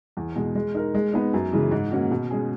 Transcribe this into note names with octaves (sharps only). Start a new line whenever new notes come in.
E2
B2 G#3
G#3
D#4 A#4
G#3
B3 D#4
F#2
C#3 E3 G#3
G#2
D#3 A#3 C#4 F#4
B2
G#3 C#4 G#4